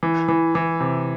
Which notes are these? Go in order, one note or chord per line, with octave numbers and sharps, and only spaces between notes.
E3
E3
E3
C3